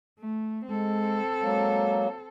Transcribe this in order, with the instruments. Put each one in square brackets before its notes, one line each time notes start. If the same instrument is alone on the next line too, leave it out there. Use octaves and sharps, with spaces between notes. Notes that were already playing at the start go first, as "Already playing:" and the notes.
[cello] A3
[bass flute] G#3 [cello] C4 A4
[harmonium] F#3 A#3 [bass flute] G#3